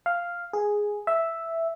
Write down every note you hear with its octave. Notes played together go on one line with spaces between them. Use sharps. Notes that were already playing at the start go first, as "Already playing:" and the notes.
F5
G#4
E5